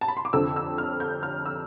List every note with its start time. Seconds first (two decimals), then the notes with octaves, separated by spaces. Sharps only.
0.01 A5
0.08 B5
0.17 C6
0.25 D6
0.33 F2 D3 F3 E6
0.56 E6
0.78 F6
1.00 G6
1.23 F6
1.46 E6